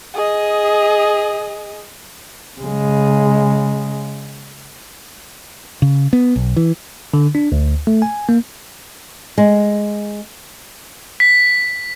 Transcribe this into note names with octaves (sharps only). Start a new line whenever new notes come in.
G#4 D#5
C#3 G#3
C#3
B3
B1
E3
D3
D4
D2
A3
G#5
A#3
G#3
B6